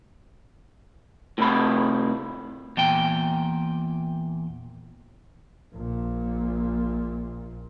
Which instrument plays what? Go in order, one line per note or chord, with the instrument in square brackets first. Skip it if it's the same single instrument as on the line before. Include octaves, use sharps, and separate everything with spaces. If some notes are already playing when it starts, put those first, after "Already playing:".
[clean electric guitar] A2 C3 B5
E2 A#2 G5
[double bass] A#1 A#2